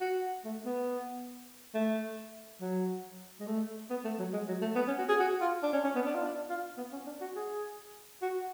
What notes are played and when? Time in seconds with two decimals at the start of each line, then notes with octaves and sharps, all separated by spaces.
0.01 F#4
0.45 A3
0.66 B3
1.74 A3
2.61 F#3
3.40 G#3
3.47 A3
3.90 B3
4.04 A3
4.19 F#3
4.33 G#3
4.48 F#3
4.62 A3
4.76 B3
4.88 C#4
4.98 F#4
5.09 G#4
5.20 F#4
5.41 F4
5.63 D4
5.73 C#4
5.84 C#4
5.95 B3
6.06 D4
6.15 F4
6.24 D4
6.50 F4
6.77 B3
6.92 C#4
7.06 D4
7.21 F#4
7.36 G#4
8.22 F#4